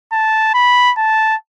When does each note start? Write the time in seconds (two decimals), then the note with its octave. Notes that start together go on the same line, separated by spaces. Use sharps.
0.13 A5
0.54 B5
0.97 A5